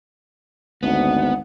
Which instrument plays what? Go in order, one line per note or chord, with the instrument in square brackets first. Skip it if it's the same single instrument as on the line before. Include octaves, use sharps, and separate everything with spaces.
[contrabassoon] G#1 [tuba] D2 [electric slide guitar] B3 [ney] F#5